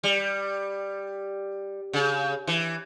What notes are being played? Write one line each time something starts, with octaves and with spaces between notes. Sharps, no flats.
G3
C#3
E3